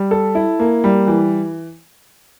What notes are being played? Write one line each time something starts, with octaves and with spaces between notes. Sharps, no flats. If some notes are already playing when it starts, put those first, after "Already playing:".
Already playing: G3
A4
E4
A#3
G3
E3